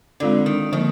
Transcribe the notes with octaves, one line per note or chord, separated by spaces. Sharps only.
D3 G#3 C4 F4 A4 D5
D#3
D3 D#3 F3 A#3 D#4